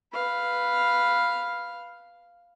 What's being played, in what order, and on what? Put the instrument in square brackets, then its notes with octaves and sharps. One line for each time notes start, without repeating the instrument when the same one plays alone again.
[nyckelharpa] B4 F5